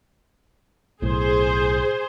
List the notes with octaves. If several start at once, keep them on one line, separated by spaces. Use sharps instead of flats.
B1 A2 G#4 C5